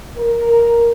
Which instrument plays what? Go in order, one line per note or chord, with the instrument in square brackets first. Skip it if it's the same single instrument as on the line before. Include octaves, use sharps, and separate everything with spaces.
[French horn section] A#4